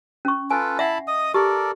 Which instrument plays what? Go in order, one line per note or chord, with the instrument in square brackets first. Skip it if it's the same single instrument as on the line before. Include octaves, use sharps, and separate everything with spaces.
[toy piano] C#4 C#6
[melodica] F4 A4 B4 [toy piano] G#5
[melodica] E4 A5 B5 [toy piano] E5 F#5
[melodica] D#5 D#6
[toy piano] G4 [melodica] A4 A#4 D5